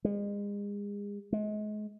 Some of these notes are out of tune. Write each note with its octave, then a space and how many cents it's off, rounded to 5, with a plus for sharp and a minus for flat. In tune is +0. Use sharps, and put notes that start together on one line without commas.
G#3 -35
G#3 +30